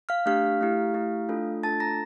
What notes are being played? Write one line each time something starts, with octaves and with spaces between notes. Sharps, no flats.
F5 F6
A3 D4 G4 F5 F6
A3 E4 G4
A3 E4 G4
A3 D4 F4 A4
A3 D4 F4 A4 A5 A6
A#5 A#6